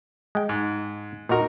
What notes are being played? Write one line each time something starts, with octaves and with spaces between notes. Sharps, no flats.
G#3 G5
G#2
A#2 D#4 F#4 A#4